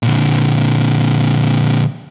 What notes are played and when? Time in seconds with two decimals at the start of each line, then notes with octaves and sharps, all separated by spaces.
0.03 A#2 D3